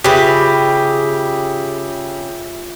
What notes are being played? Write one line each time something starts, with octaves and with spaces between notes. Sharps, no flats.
C#3 F4 G4 B4 E5 E6